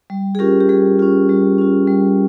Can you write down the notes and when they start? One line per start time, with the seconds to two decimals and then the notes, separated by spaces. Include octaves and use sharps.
0.10 G3
0.35 G#4
0.39 C#4 F4 G4 A#4
0.61 G4
0.69 G3 G#4
0.99 C#4 F4
1.29 G3
1.58 C#4 F4
1.87 G3